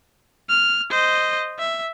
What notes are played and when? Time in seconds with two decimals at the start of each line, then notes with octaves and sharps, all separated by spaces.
0.49 F6
0.90 C5 D#5
1.59 E5